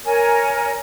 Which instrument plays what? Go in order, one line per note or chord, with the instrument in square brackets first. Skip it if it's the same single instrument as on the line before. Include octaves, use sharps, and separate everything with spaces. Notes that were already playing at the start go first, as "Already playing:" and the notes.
[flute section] A#4 C#5 G#5